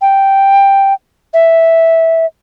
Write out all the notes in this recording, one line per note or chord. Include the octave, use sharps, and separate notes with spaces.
G5
E5